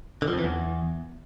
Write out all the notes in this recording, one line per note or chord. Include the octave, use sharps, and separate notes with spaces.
D3
F3
F2
E3
E2